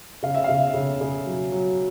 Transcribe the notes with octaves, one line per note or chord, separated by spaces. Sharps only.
C#3 F5
E5
C#3 F5
C#3
C#3
F#3
F#3